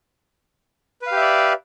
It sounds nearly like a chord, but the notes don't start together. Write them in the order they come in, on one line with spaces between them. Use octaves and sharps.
B4 F5 G4 E5 D5